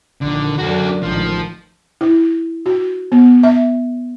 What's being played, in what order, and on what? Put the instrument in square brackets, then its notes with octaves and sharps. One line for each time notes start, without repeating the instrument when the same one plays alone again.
[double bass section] A#1 D#3 [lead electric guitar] D3
[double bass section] F#2 D3 [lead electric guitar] F#4 A4
[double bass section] A1 G#2 D#3 [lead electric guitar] F3
[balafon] E4
F#4
B3
E5